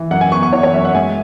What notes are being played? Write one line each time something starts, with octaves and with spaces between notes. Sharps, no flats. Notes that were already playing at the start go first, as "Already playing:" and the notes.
Already playing: E3
F#2 F#5
G#5
B3 C#6
C#6
E3 C#5
C#5
F#2 E5
F#5
G#3 G#5